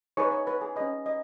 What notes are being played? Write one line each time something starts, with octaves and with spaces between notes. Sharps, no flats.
D#4 G#4 B4 C#5 C#6
C#5 C#6
B4 B5
G#4 G#5
C#4 G#4 B4 D#5
D#5